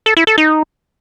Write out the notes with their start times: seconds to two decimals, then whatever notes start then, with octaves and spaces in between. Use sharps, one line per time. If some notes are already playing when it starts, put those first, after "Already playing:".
0.06 A4
0.17 E4
0.27 A4
0.38 D#4